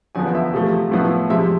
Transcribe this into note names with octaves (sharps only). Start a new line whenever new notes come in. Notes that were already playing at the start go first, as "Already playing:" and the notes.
E2 D3 F3 B3 G#5
E5
E2 C3 F3 A3
A2 F3 B3 E4
F2 C3 G#3 E5